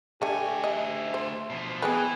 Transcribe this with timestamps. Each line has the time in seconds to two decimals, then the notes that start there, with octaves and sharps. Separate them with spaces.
0.22 D2 D3 A3 G4 G#5
0.64 D#5 E5
1.14 C5
1.50 B2 F3
1.82 E3 B3 C4 G#4 B4